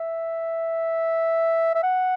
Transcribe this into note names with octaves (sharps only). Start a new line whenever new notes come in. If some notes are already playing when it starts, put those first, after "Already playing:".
Already playing: E5
E5
F#5